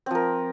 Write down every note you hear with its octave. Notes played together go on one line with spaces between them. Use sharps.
F3 C4 A#4